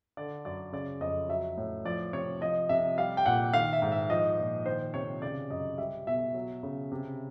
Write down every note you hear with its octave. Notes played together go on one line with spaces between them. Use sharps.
D3 D5
F#2 D5
C#3 D5
F2 D#5
F#3 E5
A2
F3 D5
C3 C#5
F3 D#5
C3 E5
G3 F5
G5
A#2 F#5
D#3 F5
E5
G#2
E5
F3 D#5
A#2
D#3 C5
C3 C#5
C#3 D5
F#2 D#5
G3 E5
B2 E5
F#3
C#3
C3